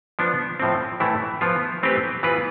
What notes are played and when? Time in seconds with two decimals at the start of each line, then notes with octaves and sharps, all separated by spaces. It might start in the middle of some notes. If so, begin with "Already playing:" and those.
0.19 F3 B3 D4
0.60 A2 F3 A3 C4
1.00 A2 E3 A3 E4
1.41 F3 B3 F4
1.83 E3 A3 C4 G4 B4
2.23 E3 B3 F4 B4